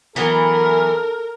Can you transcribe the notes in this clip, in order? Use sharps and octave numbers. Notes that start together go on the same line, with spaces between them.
E3 F#3 B3 A4 A#4